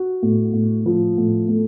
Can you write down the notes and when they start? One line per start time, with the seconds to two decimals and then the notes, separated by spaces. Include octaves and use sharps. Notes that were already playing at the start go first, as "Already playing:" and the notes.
Already playing: F#4
0.22 A2
0.53 A2
0.86 F3
1.17 A2
1.48 A3